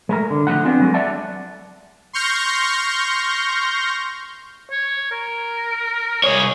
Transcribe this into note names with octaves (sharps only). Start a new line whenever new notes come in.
G#3 A3 A#4
D3
D3 F3 A3 D#4 F#5
B3 C4 D4 F4 G#4
F#3 G#3 A3 G#4
D5 E5 F#5 A5
C6 C#6 F6 G6 A#6
C#5
A#4
C2 G#4 C#5